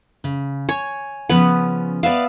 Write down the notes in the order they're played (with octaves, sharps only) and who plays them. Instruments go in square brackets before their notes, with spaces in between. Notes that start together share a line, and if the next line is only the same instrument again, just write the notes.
[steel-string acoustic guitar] C#3
[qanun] C#5 [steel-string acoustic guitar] G#5
[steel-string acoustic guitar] C#3 F3 C#4 [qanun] B3 B4
[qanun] B3 E5 F5 [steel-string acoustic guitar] B4 D5